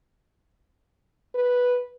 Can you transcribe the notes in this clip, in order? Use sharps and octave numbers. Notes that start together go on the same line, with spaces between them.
B4